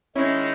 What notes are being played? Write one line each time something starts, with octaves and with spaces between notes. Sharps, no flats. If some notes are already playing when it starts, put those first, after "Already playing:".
D#3 G#3 C#4 D#4 E4 G#4 D#5